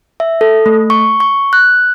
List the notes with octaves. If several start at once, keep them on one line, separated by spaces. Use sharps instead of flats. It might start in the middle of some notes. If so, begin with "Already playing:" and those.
E5
A4
A3
C#6
C#6
F#6